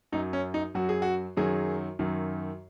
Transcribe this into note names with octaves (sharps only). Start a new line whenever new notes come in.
F#2 F#3 D#4
C#4
D#4
F#2 F#3 F#4
G#4
F#4
F#2 D#3 F#3 G#4
F#2 D#3 F#3